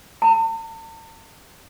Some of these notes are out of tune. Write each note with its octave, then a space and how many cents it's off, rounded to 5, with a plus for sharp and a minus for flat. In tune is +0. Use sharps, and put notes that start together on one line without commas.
A5 +45